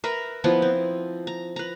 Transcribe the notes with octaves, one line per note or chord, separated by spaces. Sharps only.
A#4 B4 E5 A#5
F3 B3 E4
C4
A#5
B4 A#5